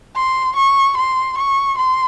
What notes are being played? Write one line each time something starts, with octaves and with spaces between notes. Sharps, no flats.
C6
C#6
C6
C#6
C6